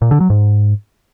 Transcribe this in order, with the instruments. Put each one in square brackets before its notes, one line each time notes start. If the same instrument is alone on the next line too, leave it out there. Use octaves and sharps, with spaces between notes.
[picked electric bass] A#2
D3
F#3
G#2